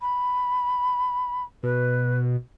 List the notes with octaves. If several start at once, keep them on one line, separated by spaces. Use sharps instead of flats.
B5
B2 B4